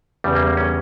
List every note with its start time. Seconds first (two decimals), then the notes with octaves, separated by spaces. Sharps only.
0.24 E2 C#3 G3
0.35 A#3
0.47 A#3
0.57 C#4